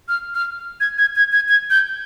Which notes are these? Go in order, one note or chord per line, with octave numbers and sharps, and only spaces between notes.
F6
F6
G#6
G#6
G#6
G#6
G#6
G6